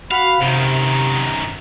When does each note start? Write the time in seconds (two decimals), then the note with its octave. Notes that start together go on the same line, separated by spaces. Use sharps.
0.11 F#4 F5 F#5 B5
0.41 F#2 C3 D#3